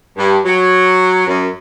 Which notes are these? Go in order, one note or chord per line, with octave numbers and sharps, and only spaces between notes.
G2
F#3
F#2